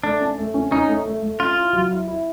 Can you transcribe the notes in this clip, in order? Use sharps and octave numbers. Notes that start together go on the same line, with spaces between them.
A3 D4
C#4
A3
C#4
C#4 D#4
A3
A3
A3
C#4 F4
E4
F#3
E4
E4